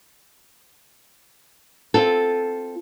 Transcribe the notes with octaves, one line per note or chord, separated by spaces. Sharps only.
C4 F4 A4